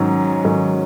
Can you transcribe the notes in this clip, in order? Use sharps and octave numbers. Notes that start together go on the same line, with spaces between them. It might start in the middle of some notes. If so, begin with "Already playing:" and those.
Already playing: G#2 D#3 F#3 C#4
G#2 D#3 F#3 C#4